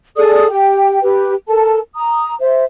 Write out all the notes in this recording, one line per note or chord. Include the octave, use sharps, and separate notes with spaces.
G#4 A4 D5 D#6
G4 G5
G4 B4
A4 A#4 A5
A#5 D#6
C5 E5